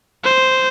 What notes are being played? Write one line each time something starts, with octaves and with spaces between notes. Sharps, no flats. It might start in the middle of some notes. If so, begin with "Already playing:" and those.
C5